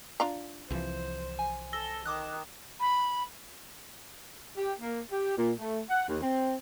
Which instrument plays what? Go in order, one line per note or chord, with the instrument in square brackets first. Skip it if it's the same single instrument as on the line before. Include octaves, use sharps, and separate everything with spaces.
[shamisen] D4 F4 A#5
[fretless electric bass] C2 E3 F3 [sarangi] C5
[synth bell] G#5
[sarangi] A4 [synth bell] E6 A#6 G7
[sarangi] D#3 [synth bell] D6 D#6 F#6
[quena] B5
[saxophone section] G4
A#3
G4
A#2
A3
F#5
D#2
C4